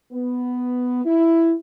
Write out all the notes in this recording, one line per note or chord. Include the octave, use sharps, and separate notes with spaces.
B3
E4